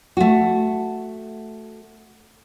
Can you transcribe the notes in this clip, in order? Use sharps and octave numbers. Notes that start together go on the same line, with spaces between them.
A3 F#4